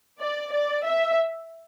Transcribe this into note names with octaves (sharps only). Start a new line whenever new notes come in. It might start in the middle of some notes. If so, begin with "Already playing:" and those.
D5
D5
E5